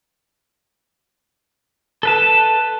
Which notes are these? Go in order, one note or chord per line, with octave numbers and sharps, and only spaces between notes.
A4 B4 A5